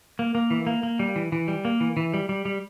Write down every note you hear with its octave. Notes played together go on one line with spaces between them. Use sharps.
A#3
A#3
E3
A#3
A#3
G3
E3
E3
G3
A#3
E3
E3
G3
G3
G3